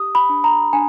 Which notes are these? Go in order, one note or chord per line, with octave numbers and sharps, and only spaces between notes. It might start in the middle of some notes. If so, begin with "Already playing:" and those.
Already playing: G4 D#6
B5
D4
A#5
D4 G#5